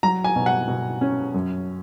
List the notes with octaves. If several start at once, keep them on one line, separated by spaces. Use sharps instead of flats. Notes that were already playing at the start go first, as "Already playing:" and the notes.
F#3 A#5
G#5
B2
F#5
B2
C#4
F#2